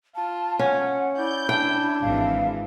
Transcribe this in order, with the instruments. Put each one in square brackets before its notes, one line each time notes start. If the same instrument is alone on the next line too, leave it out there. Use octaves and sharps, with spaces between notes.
[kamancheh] F4 [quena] A5
[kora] C#4 [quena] F#5
[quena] E4 [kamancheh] D5 [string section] G6
[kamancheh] D4 [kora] G5
[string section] G#1 E3 [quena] F5